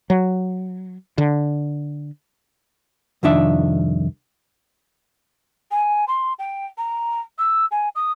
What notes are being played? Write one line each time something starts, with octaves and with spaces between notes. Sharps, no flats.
F#3
D3
C2 F2 D#3 D4 E5
G#5
C6
G5
A#5
E6
G#5
D#6